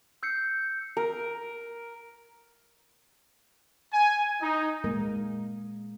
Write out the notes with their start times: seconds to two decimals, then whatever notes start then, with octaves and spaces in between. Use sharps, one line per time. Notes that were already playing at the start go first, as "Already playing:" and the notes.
0.23 E6 G6 C7 C#7
0.97 A#4
3.92 G#5
4.42 D#4
4.84 A#2 G#3 A#3 A#4